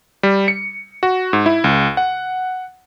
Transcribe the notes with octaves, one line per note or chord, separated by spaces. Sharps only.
G3
C#7
F#4
G#2
E4
C#2
F#5